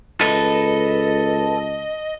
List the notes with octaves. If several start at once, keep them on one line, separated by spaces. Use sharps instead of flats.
C#2 A4 B4 D#5